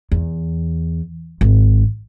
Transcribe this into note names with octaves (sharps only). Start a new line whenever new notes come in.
E2
G#1